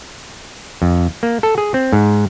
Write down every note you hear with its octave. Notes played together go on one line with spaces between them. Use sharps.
F2
A#3
A4
G#4
C4
G#2